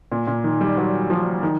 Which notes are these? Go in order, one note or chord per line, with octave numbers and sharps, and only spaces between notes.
A#2
A#2
D#3
G3
F#3
F3
D#3